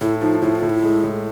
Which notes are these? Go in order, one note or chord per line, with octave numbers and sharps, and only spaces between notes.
A2 E4
F3 D#4
A2 E4
F4
A2
E4
G#3
A2